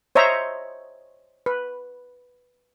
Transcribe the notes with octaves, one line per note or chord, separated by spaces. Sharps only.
C5 C#5 D#5 E5 A#5
B4